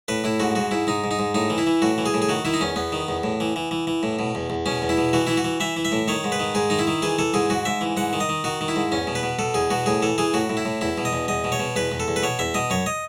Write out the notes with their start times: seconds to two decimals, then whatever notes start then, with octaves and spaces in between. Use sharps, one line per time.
0.08 A2 B4
0.24 A2 E4
0.40 G#2 F#4
0.55 G#2 F#4
0.71 G#2 E4
0.87 G#2 D#4
1.04 G#2
1.11 D#4
1.19 G#2
1.35 A2 D#4
1.50 E3
1.58 E4
1.67 E3
1.82 A2 F#4
1.98 E3
2.06 G#4
2.14 A2
2.22 G#4
2.29 D#3 F#4
2.45 D#3 E4
2.54 D#4
2.61 E2 C#4
2.76 E2 B3
2.92 D#3
3.08 E2
3.23 A2
3.40 E3
3.56 E3
3.71 E3
3.87 E3
4.03 A2
4.19 B2
4.35 E2
4.50 E2
4.66 B2 C#4
4.82 E2
4.89 E4
4.97 B2
5.13 E3 F#4
5.27 E3 E4
5.37 F#4
5.44 E3
5.60 E3 E5
5.76 E3
5.85 E5
5.92 A2
6.08 D#3 C#5
6.24 G#2
6.32 B4
6.40 D#3
6.55 G#2 G#4
6.70 D#3 D#4
6.79 E4
6.87 D#3
7.02 E3 G#4
7.19 E3 A4
7.34 G#2 G#4
7.50 G#2 F#4
7.65 G#2 E5
7.81 E3
7.97 G#2 F#5
8.13 D#3
8.21 D#5
8.29 D#3
8.44 D#3 F#4
8.61 D#3
8.68 E4
8.76 G#2
8.92 E2 C#4
9.07 B2
9.15 B4
9.23 B2
9.39 B2 A4
9.54 E2 G#4
9.71 B2 F#4
9.86 A2 G#4
10.02 E3 A4
10.18 E3 G#4
10.34 A2 F#4
10.50 A2
10.57 E4
10.65 A2
10.81 E2 E4
10.98 B2
11.05 D#5
11.13 E2
11.28 E2 D#5
11.44 B2
11.52 C#5
11.59 B2
11.76 E2 B4
11.92 E2
12.00 A4
12.08 E2
12.16 B4
12.23 B2 C#5
12.39 E2 E5
12.54 B2 D#5
12.70 F#2 C#5
12.86 D#5